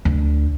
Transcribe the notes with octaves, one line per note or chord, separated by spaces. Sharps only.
D2